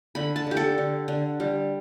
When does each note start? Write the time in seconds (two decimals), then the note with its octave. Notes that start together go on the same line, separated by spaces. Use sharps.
0.15 D3 B5
0.36 A5
0.47 D3 G4
0.57 A4
0.78 D3
1.08 D3
1.40 G3